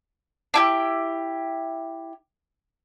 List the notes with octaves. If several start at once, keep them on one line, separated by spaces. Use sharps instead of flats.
D4 E4 G4